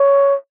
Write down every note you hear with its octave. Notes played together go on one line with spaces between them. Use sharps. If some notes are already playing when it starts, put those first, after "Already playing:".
Already playing: C#5